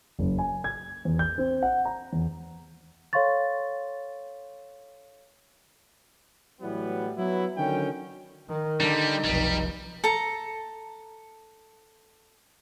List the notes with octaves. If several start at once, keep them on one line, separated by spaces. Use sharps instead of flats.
F#1
G#5
G#6
E2
G6
C4
F#5
A#5
E2
A4 C#5 F5 C6 C#6 A6
A2 E3 F#3 G3 B3
F#3 B3 E4
D3 D#3 F#3 C#4 G5
D#3
D3 G3 D#4
F1 B1 G3
A4 A#5